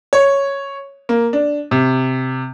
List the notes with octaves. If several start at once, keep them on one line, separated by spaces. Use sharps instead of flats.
C#5
A#3
D4
C3